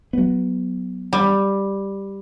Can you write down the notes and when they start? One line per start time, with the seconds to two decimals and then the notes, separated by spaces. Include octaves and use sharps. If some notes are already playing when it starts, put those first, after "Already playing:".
0.13 F#3 B3
1.13 G3